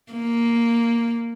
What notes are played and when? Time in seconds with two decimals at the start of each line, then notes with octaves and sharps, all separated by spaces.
0.12 A#3